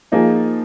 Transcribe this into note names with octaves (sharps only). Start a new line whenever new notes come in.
F3 A#3 D#4 G#4